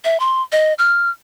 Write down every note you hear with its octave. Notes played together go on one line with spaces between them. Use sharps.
E5
C6
D#5
F6